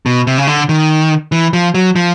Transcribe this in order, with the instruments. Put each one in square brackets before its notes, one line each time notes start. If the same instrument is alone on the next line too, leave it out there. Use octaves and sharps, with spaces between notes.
[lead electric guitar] B2
C3
C#3
D3
D#3
E3
F3
F#3
F3